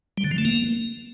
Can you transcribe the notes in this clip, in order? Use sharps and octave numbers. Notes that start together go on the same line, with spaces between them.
G3
D3
F3
A3
A#3